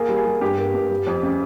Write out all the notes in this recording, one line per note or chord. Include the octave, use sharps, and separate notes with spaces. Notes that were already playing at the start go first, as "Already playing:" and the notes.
Already playing: A#3 G#4
G3
G#4
G3
G2 G4
A#3
G2
G3
F2
C#3